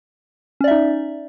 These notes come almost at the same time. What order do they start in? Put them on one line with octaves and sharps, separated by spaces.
C#4 D5 E5 D#4